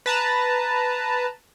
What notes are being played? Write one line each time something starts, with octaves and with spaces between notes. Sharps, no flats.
B4 A5 A#5